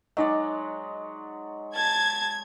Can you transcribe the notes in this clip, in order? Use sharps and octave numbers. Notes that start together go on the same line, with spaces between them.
F#3 G#3 D#4 D5
A5 G#6